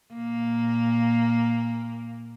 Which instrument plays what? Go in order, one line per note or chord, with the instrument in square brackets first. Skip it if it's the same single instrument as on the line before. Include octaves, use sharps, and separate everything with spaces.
[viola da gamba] A#2 A#3